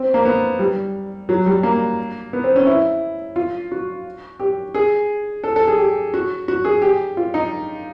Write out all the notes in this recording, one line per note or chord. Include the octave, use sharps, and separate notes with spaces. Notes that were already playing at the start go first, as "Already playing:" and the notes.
Already playing: C4
A#3
B3
G3
F#3
G3
A#3
B3
C4
C#4
E4
F4
F#4
G4
G#4
A4
A4
G#4
G4
F#4
F#4
G#4
G4
F4
D#4